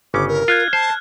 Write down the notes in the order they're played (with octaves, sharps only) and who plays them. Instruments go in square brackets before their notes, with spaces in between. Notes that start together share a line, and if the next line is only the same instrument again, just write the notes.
[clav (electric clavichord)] G1 C#3 C#4 [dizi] D6
[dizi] A#4
[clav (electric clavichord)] F4 [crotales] F6 F#6 G#6
[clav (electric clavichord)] C5 [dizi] A5